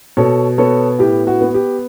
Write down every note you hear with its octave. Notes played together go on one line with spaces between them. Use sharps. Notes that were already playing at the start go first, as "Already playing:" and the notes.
B2 A4 C#5
B3 A4 C#5
A2 G4
F#4
B3
G4